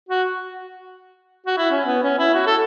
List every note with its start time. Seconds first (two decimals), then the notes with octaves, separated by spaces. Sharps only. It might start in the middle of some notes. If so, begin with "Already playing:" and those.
0.09 F#4
1.46 F#4
1.57 E4
1.71 C#4
1.86 B3
2.03 C#4
2.19 E4
2.34 F#4
2.47 A4